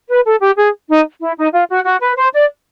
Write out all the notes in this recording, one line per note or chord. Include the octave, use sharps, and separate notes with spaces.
B4
A4
G4
G#4
D#4
E4
D#4
F4
F#4
F#4
B4
C5
D5